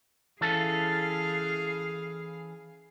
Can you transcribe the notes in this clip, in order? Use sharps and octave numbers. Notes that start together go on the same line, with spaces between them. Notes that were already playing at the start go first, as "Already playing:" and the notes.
E3 C#4 G#4 A4 F5